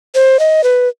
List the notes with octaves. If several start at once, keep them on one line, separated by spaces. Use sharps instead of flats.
C5
D#5
B4